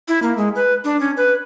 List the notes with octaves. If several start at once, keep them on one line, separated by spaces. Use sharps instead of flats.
E4
A#3
G#3
B4
D4
C#4
B4